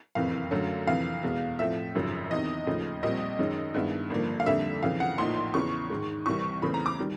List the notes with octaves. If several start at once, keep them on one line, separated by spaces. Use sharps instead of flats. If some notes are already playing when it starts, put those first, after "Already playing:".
F#1 F2 C3 E3 F5
F#2 D3 F#3 A3 C#4
F2 C3 E3 F5
E2 B2 G#3
A2 F3 A3 C4 E5
G#1 F#2 C#3 F3
E2 C3 D#3 D#5
D#2 C#3 F3 A3
A#1 A#2 G3 C4 D#5
F#2 D#3 G#3 C#4
G2 D#3 G#3 B3 E4
G#1 G2 D3 F3 A#3
F5
F2 D3 G3 A#3 E5
F2 C#3 E3 F5
F#5
A#1 A2 F3 A#3 D#4 C6
E2 C#3 E3 C#6
G#2 D#3 G#3
C2 C3 E3 G3 C4 C#6
E2 C#3 E3 A3 C4 B5
A#5
D6
D#3 G3